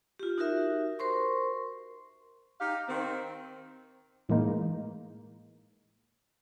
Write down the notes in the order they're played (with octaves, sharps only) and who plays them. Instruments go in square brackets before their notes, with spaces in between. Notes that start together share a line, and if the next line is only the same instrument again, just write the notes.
[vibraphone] F4 G4
D#4 F#4 G4 A#4 E5
A#4 C5 C6 C#6
[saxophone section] D#4 G4 F5
D#3 C4
[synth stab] A2 E3 G#3 A#3 D#4